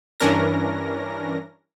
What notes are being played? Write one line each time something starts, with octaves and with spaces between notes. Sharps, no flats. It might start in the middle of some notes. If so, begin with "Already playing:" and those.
G2 E3 C#4 D4 A#4 A#6